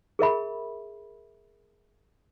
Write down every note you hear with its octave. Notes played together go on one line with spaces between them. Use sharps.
G#4 A#4 E5 B5